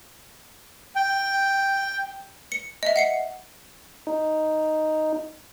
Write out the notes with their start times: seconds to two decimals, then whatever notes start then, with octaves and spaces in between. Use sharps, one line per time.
0.96 G5
2.52 C#7
2.83 D#5 E5
2.96 F#5 C7 C#7
4.07 D#4